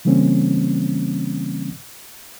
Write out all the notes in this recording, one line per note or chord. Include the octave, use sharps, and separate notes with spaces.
C#3 E3 G3 A#3 C4 C#4